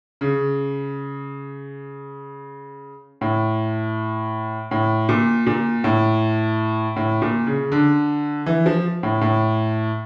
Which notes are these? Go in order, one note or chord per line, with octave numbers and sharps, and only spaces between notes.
C#3
A2
A2
A#2
A#2
A2
A2
A#2
C#3
D3
E3
F3
A2
A2